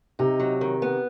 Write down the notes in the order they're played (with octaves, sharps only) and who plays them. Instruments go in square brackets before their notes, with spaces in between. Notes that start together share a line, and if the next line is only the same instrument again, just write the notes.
[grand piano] C3 [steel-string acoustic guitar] D#4
[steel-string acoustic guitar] F#3
D#3
B3